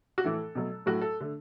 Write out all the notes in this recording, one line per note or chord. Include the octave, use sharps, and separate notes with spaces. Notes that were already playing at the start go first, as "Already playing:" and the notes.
F#4
A2 E3 A3 A4
B2 F#3 A3
A2 F#3 A3 F#4
A4
D3 A3